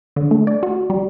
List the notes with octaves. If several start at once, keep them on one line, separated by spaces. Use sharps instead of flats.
D3
A3
D5
F#4
G3